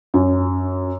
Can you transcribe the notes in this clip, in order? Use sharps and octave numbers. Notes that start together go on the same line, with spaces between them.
F#2